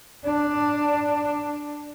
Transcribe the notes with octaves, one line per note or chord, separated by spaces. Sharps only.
D4